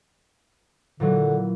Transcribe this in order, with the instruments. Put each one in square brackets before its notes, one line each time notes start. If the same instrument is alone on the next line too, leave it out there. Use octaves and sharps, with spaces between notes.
[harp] A#2 E3 F#3 [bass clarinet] D3